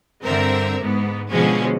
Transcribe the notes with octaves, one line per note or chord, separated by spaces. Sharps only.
G2 D3 C4 A#4 E5
G#2 B3
B2 D3 F3 G#3 C#4